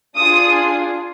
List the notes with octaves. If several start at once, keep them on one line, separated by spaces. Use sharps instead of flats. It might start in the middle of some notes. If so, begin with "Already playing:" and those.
D4 F4 G#4 D#6